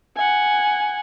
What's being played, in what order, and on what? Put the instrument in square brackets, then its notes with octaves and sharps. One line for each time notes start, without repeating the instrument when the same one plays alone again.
[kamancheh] F#5 G#5